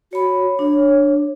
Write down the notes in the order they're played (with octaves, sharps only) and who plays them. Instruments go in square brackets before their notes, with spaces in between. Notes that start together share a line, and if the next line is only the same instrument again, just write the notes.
[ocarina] F#4 [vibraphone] C#5 B5
[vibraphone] D4 [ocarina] C#5